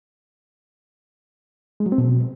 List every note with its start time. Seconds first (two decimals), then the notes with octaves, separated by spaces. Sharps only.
1.80 G#3
1.86 F#3
1.92 C4
1.98 B2